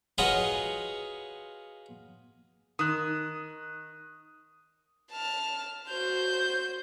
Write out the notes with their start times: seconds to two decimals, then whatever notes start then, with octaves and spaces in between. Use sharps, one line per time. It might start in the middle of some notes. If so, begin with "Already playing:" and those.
0.18 F4 F#4 G#4 B4 C#5 D#5
2.79 D#3 D#6 F#6
5.14 A5 F6
5.88 F#4 C5 G6